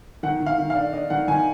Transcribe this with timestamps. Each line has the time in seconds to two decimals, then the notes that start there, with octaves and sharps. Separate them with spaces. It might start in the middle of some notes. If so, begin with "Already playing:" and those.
0.23 D#3 F#5
0.40 D#3
0.46 F5
0.58 D#3
0.70 F5
0.75 D4
0.93 D4 D#5
1.10 D#3 F#5
1.28 D#3 G#5